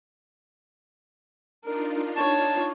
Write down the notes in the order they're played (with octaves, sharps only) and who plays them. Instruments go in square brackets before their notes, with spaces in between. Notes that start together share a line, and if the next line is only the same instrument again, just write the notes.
[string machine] D4 D#4 F4 [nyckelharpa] A#4
[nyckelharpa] C#5 C#6 [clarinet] A5